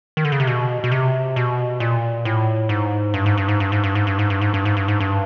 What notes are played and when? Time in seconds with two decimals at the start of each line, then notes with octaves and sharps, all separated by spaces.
0.17 D#3
0.25 D3
0.32 C#3
0.40 C3
0.47 B2
0.84 B2
0.92 C3
1.36 B2
1.80 A#2
2.25 A2
2.69 G#2
3.14 G2
3.26 G#2
3.37 G2
3.48 G#2
3.60 G2
3.72 G#2
3.84 G2
3.95 G#2
4.07 G2
4.19 G#2
4.30 G2
4.41 G#2
4.54 G2
4.65 G#2
4.77 G2
4.88 G#2
5.00 G2